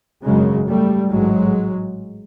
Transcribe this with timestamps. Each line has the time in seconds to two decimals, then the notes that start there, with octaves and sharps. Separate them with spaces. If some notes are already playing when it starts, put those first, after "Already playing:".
0.23 G#1 F#2 C#3 F#3 G#3
0.67 G3 A3
1.10 A1 G#2 F#3 G#3